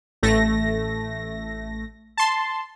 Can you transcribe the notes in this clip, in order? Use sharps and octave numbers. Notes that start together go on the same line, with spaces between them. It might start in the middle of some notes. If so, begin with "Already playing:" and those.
A1 A3 A#6
A5 C6